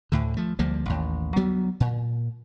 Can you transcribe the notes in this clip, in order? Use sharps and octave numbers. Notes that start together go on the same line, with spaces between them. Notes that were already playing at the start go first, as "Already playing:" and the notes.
D2 A2 D3
F3 A3
D2 F3 G3 A#3
A1 D#2
D2 F#3 G3 B3
A#2